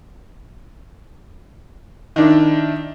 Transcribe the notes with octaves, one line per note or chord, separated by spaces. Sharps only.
D#3 D4 E4